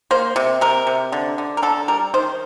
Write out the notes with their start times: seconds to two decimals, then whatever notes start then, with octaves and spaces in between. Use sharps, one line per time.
0.11 A#3 C5
0.36 C3
0.61 C3 A#4
0.87 C3
1.12 D3
1.38 D3
1.57 A#4
1.62 D3 A4
1.88 G3 A#4
2.14 D#3 C5